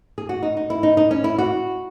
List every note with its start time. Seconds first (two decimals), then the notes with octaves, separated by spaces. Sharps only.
0.18 G#4
0.29 F#4
0.43 D#4
0.57 D#4
0.70 E4
0.83 D#4
0.97 D#4
1.11 C#4
1.24 E4
1.38 F#4